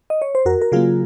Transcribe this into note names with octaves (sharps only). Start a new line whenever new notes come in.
D#5
C#5
C5
F2 F#4 A#4
A#4
C#3 F#3 A#3 F4 G#4